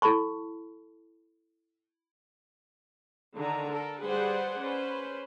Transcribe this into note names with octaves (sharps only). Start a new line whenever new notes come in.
E4 A4 A5 B5 C#6
D3 D#3 A#5
A4 A#4
G3 G#4 B4 C5 D5 F#5
C#4 B4 C5